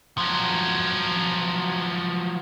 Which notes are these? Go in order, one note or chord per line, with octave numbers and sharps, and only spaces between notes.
F3 F#3